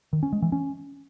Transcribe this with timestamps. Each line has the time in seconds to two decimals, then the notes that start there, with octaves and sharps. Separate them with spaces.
0.13 D#3
0.23 C#4
0.33 G#3
0.42 E3
0.52 C#4